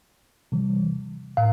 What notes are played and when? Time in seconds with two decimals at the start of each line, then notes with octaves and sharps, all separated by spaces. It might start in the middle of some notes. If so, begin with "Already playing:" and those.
0.52 C3 E3 G3
1.37 A2 F5